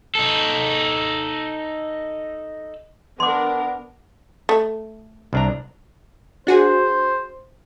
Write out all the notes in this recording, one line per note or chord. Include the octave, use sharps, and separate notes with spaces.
D#4 A4
B3 D4 A#4 C6 D6
A3
C2 D4 A#5
D4 F#4 G#4 C5